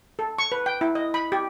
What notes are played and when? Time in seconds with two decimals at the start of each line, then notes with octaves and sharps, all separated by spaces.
0.19 A4
0.39 C#6
0.52 B4
0.66 G5
0.81 E4
0.95 D#5
1.14 B5
1.32 G4